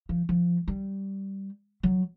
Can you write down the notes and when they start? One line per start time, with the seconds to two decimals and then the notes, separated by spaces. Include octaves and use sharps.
0.09 F3
0.29 F3
0.68 G3
1.83 F#3